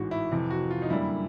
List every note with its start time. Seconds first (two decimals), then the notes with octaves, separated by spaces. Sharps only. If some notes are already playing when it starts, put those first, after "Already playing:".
Already playing: A1 G#2 E3 F#4
0.11 E4
0.31 F2 C3 E3
0.50 F#4
0.71 F4
0.82 D#4
0.90 F#2 D3 G3 A#3 E4